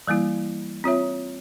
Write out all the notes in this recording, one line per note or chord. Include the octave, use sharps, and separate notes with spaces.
E3 G3 A#3 E4
C4 F4 C#5 E5